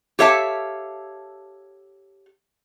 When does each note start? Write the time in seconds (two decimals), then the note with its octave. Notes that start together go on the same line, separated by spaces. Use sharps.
0.19 G4 A4 C#5 E5 F5 A5